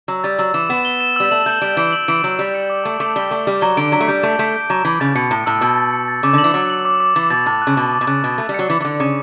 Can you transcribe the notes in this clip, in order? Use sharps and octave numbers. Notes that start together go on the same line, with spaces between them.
F#3 E6
G3 A6
F#3 E6
E3 E7
B3 E7
G7
E7
G3 E6
A3 F#7
A3 G6
G3 D7
E3 D7
F#7
E3 D7
F#3 G6
G3 D7
C#7
D6
A3 D6
A3 D6
G3 G7
A3 D6
G3 D6
F#3 G7
D3 D7
F#3 B6
A3
G3 G6
A3 G6
A3 G6
G6
F#3 D7
E3 B6
C#3 A6
B2 C#7
A2 C#7
A2 E6
B2 E6
A6
C#7
A6
C#3 D6
D3 F#7
E3
F#3 A6
F#7
D6
D6
E3 A6
B2 A6
A2 D6
F#6
C#3
B2 D6
D6
B2
C#3 F#6
B2 F#6
A3 F#6
G3
F#3 C#7
E3 A6
E3
D3 F#6
C#3 C#7